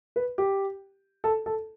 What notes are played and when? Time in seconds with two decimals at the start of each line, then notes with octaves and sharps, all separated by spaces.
0.16 B4
0.38 G4
1.24 A4
1.46 A4